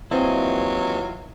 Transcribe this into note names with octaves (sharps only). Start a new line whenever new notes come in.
D#2 D#3 E3 F#3 C4 E4 F4 D#5